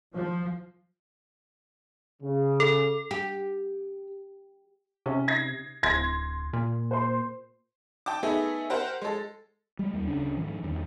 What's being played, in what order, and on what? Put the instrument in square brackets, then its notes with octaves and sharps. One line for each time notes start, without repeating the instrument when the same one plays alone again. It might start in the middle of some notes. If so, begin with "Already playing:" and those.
[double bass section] F3
[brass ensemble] C#3
[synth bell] A4
[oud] G4
[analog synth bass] C3 [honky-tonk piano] C#4
[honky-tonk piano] G#6 A#6 C7
[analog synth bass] D1 [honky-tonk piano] C6 G#6 A#6
[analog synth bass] A#2
[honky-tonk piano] C5 C6
G5 A5 D6
A3 B3 D#4 G#4 E5
G4 A#4 C5 F#5
G#3 A4
[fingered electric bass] G3 G#3
D#2 G3
D1 C#3 C#4 D4
G#2 D#3 F3
E2 G2 D3 D#3